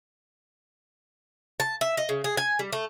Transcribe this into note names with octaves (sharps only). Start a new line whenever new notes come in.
A5
E5
D#5
C#3
G#4
G#5
G3
A3